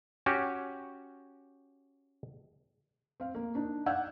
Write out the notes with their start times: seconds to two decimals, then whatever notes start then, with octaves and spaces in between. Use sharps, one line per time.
0.26 C#4 F#4 G4
3.20 C4 F5
3.35 A#3
3.55 D4 D#4
3.86 D5 F5 F#5 E6 G6 G#6